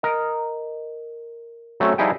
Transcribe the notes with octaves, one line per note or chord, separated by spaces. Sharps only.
A#4 D#5
F#3 A3 C4 C#4 A4
F3 G3 D#4 E4 G#4 G5